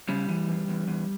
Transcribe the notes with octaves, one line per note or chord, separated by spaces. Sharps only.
C#3 G3
E3
E2
E2
E2